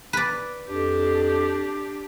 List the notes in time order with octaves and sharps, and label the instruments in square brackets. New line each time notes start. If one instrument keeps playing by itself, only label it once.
[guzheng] B4 D5
[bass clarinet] F2 [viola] D4 G4